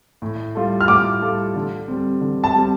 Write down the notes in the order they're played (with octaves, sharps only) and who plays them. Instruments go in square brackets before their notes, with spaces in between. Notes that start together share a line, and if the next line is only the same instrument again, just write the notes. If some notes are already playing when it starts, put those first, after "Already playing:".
[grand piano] A2
G3 F4 A4
[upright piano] F6
[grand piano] A2 [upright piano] D6
[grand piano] G3 F4 A4
D3
G3 C4
D3
[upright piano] A5
[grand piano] G3 C4